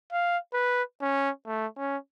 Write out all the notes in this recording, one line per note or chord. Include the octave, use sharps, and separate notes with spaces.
F5
B4
C#4
A3
C#4